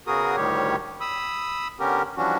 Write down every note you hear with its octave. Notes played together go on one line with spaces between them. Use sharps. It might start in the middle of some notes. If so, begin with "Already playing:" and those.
C#3 B3 F#4 G#4 A#4 D#6
D2 A2 D#3 G3 G4 C#5
B5 D#6 E6
D3 B3 C#4 G4 A#4
E3 F3 G3 C#4 D4 F#4